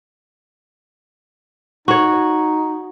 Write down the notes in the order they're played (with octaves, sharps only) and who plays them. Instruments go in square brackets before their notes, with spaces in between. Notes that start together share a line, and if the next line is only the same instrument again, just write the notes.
[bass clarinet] D#4 [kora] F#4 C#5